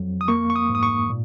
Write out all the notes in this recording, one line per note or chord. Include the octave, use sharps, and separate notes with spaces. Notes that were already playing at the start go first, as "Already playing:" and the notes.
Already playing: F2 F#3
D#6
A#3 C#6
C#6
D#6
G#2
D#6
C#6
A#2